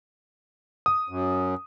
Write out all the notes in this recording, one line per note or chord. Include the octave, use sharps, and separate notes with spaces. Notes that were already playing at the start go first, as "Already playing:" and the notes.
D#6
F#2